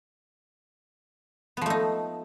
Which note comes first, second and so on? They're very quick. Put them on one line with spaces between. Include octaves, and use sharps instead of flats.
B3 F3 A3 D#4